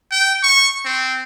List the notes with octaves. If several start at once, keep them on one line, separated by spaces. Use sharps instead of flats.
G5
C#6
C4